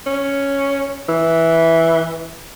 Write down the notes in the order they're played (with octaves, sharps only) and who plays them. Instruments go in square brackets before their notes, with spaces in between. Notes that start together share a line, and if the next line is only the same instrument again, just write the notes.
[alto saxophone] C#4
E3